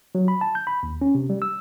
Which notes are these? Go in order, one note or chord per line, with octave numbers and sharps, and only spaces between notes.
F#3
B5
A5
G6
B5
D#2
C#4
C3
G3
E6